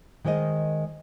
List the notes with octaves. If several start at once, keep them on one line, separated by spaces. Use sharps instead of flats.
D#3 G#3 C5 D5 D#5